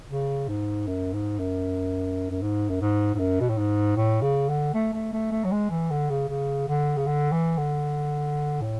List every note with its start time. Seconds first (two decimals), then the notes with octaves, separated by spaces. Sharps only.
0.09 C#3
0.48 G#2
0.87 F#2
1.13 G#2
1.39 F#2
2.30 F#2
2.42 G#2
2.69 F#2
2.81 G#2
3.15 G#2
3.19 F#2
3.40 B2
3.49 A2
3.58 G#2
3.97 A2
4.22 C#3
4.49 D3
4.74 A3
4.93 A3
5.13 A3
5.32 A3
5.44 F#3
5.51 G#3
5.70 E3
5.90 D3
6.10 C#3
6.29 C#3
6.68 D3
6.97 C#3
7.06 D3
7.32 E3
7.58 D3
8.61 A2